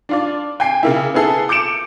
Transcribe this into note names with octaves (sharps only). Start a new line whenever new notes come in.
D4 F4 D5
G5 G#5 C7
C#3 A#3 E4
B3 E4 G#4 A4
D6 G6 C#7 D7 E7